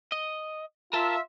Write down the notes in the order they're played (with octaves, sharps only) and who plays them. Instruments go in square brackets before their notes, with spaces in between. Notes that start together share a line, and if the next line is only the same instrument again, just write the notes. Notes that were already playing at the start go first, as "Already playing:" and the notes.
[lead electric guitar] D#5
[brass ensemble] F4 E5 [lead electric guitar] A#4 A5